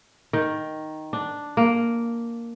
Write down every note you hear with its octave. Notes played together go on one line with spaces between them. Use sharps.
D#3
D4
A#3